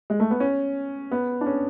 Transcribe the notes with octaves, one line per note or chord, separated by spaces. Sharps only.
G#3
A3
B3
C#4
B3
D4
C#4